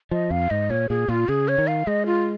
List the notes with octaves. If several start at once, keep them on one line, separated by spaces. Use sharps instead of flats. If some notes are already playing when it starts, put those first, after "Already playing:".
F3 D#5
F2 F5
G#2 D#5
A#2 C#5
A#2 G#4
A#2 F4
C#3 G#4
C#5
D#3
F5
G#3 D#5
F4